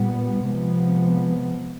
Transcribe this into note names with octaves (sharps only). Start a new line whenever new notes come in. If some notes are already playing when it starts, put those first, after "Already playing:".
Already playing: A#2 G3 B3
C3 F3 G#3 B3